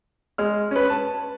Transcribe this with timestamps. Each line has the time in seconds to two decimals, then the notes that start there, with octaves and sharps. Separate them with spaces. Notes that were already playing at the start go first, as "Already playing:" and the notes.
0.38 G#3 F6
0.71 C#4 B4
0.89 A5